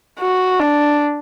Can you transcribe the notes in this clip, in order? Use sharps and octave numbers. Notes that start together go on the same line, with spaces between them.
F#4
D4